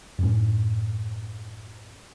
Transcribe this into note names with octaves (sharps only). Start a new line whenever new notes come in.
F#2 A2 C#4